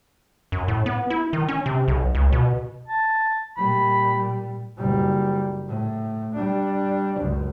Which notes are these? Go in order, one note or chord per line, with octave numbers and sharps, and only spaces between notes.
F#2
A2
B3
E4
D#3
C#4
C3
B1
C#2
B2
A5
A#2 G3 B5
F#1 G3
A2
G3 D4
C#2 F#2